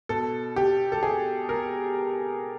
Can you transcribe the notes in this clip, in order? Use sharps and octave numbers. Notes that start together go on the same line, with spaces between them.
B2 A4
G4
A4
G#4
A#4